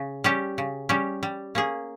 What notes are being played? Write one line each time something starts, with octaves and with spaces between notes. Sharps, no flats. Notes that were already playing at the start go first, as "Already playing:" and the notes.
Already playing: C#3
G3 C#4 G4
C#3
G3 C#4 G4
G3
A#3 C#4 G#4